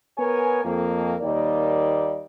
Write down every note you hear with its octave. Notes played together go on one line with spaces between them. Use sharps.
B3 A#4 C#5 G#5
F2 A#3
D#2 G3 A#3 D5 D#5